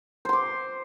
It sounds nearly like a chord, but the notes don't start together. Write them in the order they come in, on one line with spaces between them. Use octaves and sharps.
C5 C6 D6